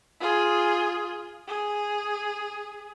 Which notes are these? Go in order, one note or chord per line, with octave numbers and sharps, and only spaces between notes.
F4 G#4
G#4